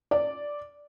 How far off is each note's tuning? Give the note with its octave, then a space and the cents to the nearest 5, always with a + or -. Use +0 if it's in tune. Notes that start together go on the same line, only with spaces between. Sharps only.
D5 -5